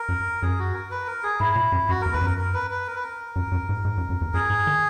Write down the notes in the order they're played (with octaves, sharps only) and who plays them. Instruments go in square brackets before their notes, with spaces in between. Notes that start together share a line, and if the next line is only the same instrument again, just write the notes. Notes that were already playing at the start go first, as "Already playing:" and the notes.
Already playing: [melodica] A#4
[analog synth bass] F#2
[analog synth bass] F#2 [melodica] G#4
[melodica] F#4
A#4
B4
A#4
G#4
[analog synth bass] G#2 [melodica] E4
[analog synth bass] A#2
F#2
[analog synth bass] F#2 [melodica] F#4
[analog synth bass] E2 [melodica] A#4
[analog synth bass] E2 [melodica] B4
[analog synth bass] F#2 [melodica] A#4
[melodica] A#4
B4
B4
A#4
B4
A#4
[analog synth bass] F#2
F#2
G#2
G#2
F#2
F#2
E2
[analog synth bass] F#2 [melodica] G#4
[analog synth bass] G#2
D#3